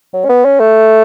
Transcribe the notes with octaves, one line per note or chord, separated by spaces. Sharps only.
F#3
C#4
B3
C#4
A3